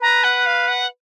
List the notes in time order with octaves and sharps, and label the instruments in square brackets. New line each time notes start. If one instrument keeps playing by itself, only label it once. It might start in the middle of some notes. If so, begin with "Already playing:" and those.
[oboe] B4 [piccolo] A#5
[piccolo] F#5
F5
F#5